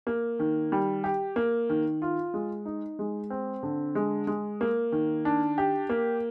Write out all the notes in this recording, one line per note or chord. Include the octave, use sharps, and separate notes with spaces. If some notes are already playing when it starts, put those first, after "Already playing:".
A#3
D#3
G3
G4
A#3
D#3
F4
G#3
D#4
G#3
C4
D3
G#3
G#3
A#3
D#3
D4
G4
A#3